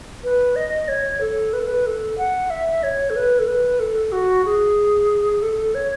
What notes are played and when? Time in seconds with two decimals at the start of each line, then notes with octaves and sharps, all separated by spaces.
0.24 B4
0.56 D#5
0.88 C#5
1.21 A4
1.53 B4
1.60 A4
1.67 B4
1.86 A4
2.18 F#5
2.50 E5
2.83 C#5
3.10 A4
3.16 B4
3.39 A4
3.48 B4
3.80 A4
4.12 F#4
4.45 G#4
5.42 A4
5.75 C#5